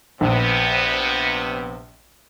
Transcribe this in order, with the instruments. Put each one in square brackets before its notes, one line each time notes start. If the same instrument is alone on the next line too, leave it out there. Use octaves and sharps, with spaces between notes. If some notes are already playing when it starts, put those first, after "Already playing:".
[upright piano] A#1 [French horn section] C3 B3